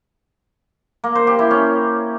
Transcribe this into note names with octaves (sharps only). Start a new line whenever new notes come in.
A#3
C5
G4
E4
C#4